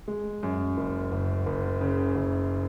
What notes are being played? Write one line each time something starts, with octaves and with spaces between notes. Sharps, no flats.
G#3
F#2
F#1
F#1
F#1
C#3
F#1